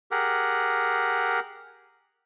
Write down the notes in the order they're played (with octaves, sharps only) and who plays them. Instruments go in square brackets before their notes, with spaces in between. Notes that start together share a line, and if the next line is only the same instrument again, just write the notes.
[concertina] G4 G#4 A#4 F#5